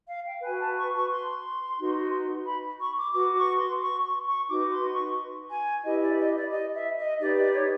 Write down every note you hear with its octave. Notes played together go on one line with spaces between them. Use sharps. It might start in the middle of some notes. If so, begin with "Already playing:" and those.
F5
G5
F#4 B4 G#5
A5
C#6
C#6
C6
D#4 F#4 B4
B5
C#6
D6
F#4 B4 D6
C#6
C6
C#6
C#6
C#6
D#4 F#4 B4 D6
C6
C#6
G#5
E4 G4 B4 D#5
D5
D#5
D5
D#5
E5
D#5
D#4 G4 B4 D5
D5
C#5